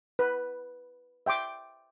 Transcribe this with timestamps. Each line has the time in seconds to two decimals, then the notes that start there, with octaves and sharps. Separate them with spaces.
0.19 B4
1.26 E5 G5 C6 D6